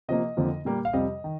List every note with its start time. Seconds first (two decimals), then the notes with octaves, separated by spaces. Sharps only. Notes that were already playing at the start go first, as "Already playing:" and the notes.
0.08 C3 F3 A#3 D#5
0.37 F2 D3 F3 A#3
0.65 A#2 G3 A#3
0.85 F5
0.93 F2 C3 G3 D#5
1.24 D#3